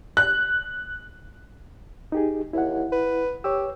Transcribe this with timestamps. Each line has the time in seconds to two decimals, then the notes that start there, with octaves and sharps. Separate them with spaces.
0.17 F#6
2.12 D#4 G4 G#4
2.53 D#2 E4 F#5
2.92 B4
3.44 G4 C#5 E6